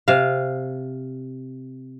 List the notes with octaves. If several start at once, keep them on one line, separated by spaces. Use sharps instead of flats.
C3 F5